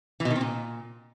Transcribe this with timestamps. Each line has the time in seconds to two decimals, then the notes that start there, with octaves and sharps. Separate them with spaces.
0.20 E3
0.25 B2
0.30 D#3
0.36 C4
0.41 A#2